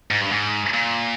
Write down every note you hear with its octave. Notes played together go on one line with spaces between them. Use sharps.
G#2
G2
G#2
A#2